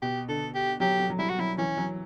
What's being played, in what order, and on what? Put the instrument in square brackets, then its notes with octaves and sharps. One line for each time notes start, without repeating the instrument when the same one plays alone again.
[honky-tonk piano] B2 [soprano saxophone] G4
[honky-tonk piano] D3 [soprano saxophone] A4
[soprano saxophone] G4
[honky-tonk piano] F#3 [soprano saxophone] G4
[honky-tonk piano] F#3
F#3
[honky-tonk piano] G3 [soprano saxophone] E4
[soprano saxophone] F#4
[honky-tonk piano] F#3 [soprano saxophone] E4
[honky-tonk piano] E3 [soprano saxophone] C#4
[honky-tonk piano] F#3